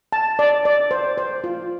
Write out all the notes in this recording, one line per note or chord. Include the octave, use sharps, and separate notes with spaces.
A5
D5
D5
C5
C5
F4